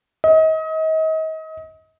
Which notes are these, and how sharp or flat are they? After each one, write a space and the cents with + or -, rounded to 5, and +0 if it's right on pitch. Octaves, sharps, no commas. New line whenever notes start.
D#5 +35